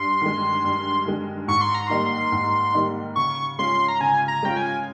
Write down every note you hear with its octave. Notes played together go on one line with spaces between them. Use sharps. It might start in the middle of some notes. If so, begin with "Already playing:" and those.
Already playing: G2 C6
D#3 G#3
G2
D#3 G#3
G#2 C#6
C6
A#5
D#3 G3 A#3 D#4 C6
G#2
D#3 G3 A#3 D#4
C#3 C#6
G#3 C#4 F4 C6
A#5
C#3 G#5
A#5
G#3 C#4 F4 G5
G#5